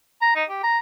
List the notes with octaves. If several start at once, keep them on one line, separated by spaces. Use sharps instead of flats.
A#5
D#4
G4
A#5